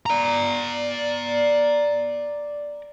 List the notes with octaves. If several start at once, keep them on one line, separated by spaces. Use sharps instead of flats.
D5 A#5